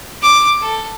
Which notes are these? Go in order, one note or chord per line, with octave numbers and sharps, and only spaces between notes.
D6
A4